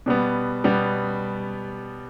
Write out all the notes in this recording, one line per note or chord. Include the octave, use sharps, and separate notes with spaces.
B2 G3 B3
B2 G3 B3